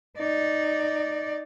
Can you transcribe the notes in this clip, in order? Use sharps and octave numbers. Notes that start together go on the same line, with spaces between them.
D#4 D5